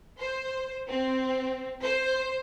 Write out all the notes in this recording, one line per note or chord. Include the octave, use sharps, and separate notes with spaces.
C5
C4
C5